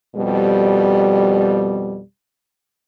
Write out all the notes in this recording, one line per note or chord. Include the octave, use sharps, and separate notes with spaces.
F2 B2 G3